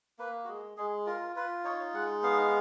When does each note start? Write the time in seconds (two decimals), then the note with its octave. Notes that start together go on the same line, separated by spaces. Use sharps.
0.19 A#3 B4
0.44 F#4
0.48 G#3 G#4
0.77 G#3 G#4
1.06 F4 A#4
1.36 F4 B4
1.65 D#4 C#5
1.93 G#3 F#5
2.23 B3 F5